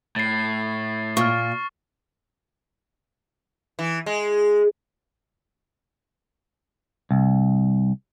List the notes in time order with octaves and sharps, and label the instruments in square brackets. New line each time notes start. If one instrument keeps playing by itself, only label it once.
[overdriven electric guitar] A2 [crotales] A6 C7
[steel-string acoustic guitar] A#2 [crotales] C#6 F6
[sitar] E3
G#3
[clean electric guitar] C2